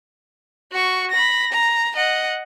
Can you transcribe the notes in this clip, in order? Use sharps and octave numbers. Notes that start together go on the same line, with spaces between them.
F#4 C#6
B5 A#6
A#5
D#5 F#5